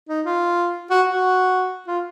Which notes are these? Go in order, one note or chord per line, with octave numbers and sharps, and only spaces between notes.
D#4
F4
F#4
F#4
F4